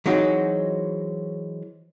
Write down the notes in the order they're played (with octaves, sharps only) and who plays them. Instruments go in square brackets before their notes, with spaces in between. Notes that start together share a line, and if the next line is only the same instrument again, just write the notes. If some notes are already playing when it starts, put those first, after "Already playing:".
[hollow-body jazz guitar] E3 F#3 G#3 C4 D#4 F#4